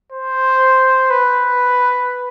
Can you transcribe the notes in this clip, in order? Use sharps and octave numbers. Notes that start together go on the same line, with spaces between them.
C5
B4